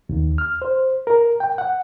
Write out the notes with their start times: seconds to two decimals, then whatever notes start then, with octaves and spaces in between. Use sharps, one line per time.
0.09 D#2
0.38 F6
0.62 C5
1.07 A#4
1.40 G5
1.58 F#5